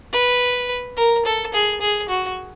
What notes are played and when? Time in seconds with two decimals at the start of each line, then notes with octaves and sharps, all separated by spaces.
0.13 B4
0.97 A#4
1.25 A4
1.54 G#4
1.81 G#4
2.09 F#4